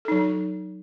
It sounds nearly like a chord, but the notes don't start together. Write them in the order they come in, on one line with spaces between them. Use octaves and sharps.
A4 D#4 F#3